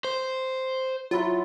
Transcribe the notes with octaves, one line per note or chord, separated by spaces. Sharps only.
C5
F#3 E4 F4 F#5